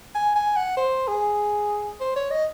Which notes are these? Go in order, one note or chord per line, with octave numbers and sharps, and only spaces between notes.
G#5
G#5
F#5
C5
G#4
C5
C#5
D#5